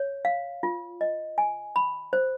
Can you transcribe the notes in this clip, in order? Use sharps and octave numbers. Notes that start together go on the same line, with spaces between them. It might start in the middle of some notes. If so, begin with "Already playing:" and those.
Already playing: C#5
F5
F4
D#5
G#5
B5
C5